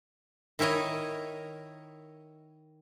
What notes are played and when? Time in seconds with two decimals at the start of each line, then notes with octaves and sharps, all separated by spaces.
0.59 D#3 E4 A#4 C#5 D#5